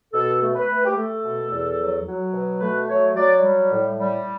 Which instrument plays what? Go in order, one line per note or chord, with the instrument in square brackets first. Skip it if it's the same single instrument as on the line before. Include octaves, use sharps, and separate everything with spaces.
[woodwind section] B2 A4
A3
B4
A3
G4
A3 A4
B2
E2
F#3
F#3
B2
A3 B4
F#3 C#5
F#3 D5
G3
A2
G3